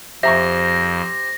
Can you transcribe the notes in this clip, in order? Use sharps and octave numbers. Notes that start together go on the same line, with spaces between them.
F2 G4 C5 E5 A#5 C#6 A#6